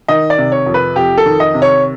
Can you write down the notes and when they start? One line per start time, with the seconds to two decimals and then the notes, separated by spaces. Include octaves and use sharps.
0.08 D#3 D#5
0.30 D5
0.38 C3
0.52 C#5
0.66 F2
0.74 B4
0.96 F2 G4
1.18 A4
1.26 D#3
1.40 D#5
1.54 C3
1.62 C#5